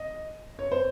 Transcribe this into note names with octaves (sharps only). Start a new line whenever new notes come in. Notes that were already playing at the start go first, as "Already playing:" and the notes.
Already playing: D#5
C#5
C5